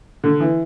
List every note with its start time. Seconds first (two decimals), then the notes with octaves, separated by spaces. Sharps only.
0.24 D3
0.40 E3